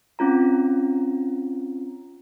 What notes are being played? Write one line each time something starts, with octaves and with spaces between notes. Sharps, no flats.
C4 C#4 F4 A#5